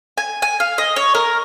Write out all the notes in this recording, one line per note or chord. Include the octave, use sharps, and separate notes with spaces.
G#5
G#5
F5
D#5
C#5
A#4